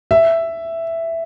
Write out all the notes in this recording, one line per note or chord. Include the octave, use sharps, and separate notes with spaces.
E5